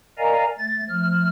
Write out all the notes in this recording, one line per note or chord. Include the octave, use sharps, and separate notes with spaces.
A#4 D5 D#5 F5 G#5 A#5
A3 A6
F3 A3 F6